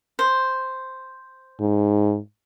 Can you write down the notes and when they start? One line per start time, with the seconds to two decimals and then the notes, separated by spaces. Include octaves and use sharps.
0.19 C5
1.61 G#2